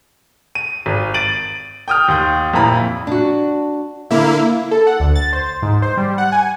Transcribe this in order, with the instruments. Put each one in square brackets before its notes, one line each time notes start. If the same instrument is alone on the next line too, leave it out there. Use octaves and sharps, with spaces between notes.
[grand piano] D#7
G#1
A6 D7 D#7 F#7
G5 D#6 F6
D#2 C6 G6
F2 A#2 E4 A#5 B5
[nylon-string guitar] D4 F#4
[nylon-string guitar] D3 [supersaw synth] A#3 E4
[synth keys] A4
F#5
D2
A6
C5
G#2
C5
G3
F#5
G#5